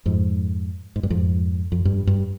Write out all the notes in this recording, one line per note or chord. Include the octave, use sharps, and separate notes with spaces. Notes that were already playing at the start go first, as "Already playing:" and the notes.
F2 G#2
G#2
G2
F2 G#2
F2
G2
G2